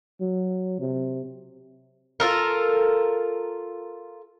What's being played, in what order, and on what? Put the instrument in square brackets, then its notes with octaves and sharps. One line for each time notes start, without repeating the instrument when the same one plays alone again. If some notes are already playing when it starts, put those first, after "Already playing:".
[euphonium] F#3
C3
[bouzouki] F4 A4 A#4